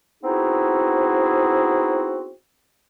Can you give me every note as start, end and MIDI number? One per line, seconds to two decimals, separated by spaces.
0.23 2.31 59
0.23 2.31 60
0.23 2.31 63
0.23 2.31 64
0.23 2.31 66
0.23 2.31 68